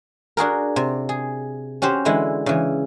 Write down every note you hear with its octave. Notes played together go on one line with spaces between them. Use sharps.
D4 F#4 G#4 A#4
C3
G#4
C#4 F#4 G4 C5
D3 E3 G#3 E4
C#3 E3